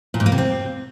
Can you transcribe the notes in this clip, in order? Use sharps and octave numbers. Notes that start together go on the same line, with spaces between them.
A#2
G#2
A#3
C3
C4